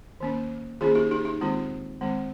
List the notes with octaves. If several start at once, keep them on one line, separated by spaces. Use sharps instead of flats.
D#3 A#3 C#4
D#3 A#3 C#4 F4 G#4
D#4 G4
D#4 G4
D#4
D#3 G#3 C4 F4
D#3 G#3 C4